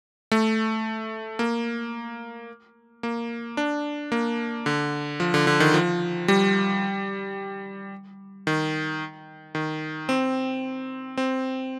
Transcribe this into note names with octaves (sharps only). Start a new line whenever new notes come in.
A3
A#3
A#3
D4
A#3
D3
F3
D3
D3
D#3
F3
G3
D#3
D#3
C4
C4